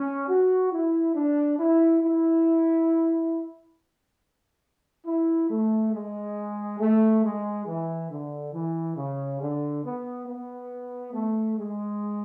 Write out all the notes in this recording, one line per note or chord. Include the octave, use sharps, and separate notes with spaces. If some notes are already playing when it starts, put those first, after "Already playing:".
Already playing: C#4
F#4
E4
D4
E4
E4
E4
A3
G#3
A3
G#3
E3
D3
E3
C#3
D3
B3
B3
A3
G#3